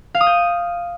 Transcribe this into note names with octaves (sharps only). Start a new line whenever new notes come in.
F5
D#6
G6